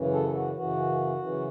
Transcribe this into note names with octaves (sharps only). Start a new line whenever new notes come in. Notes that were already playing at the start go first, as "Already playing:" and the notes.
Already playing: F#2 C#3 E3
A4
F#4
F#2 C#3 E3 F#4
F#2 C#3 E3